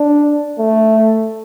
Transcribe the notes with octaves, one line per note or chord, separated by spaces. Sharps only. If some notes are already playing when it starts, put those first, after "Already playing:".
Already playing: D4
A3